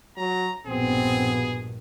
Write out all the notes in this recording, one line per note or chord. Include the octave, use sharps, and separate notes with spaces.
F#3 A#5
A#1 G2 B2 B3 C4 G#4